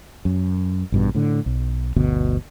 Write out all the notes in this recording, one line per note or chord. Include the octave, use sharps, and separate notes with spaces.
F#2
A1 G2 B2
A2 D3
B1
G1 D2 B2